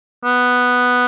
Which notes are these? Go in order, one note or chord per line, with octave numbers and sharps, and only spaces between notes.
B3